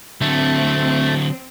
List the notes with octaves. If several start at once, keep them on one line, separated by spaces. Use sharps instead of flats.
D3 F#3 A3 C4